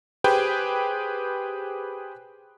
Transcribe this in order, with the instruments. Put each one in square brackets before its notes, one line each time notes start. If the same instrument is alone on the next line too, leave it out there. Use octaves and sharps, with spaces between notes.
[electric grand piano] G4 G#4 B4 C5 G5